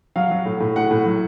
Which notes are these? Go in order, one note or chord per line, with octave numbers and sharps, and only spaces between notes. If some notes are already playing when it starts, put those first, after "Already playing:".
F#3 F5
F#3
A2
A2
A2 F#5
A2
F#3